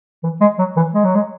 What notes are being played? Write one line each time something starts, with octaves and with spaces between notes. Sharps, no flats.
E3
G#3
F#3
E3
G#3
F#3
G#3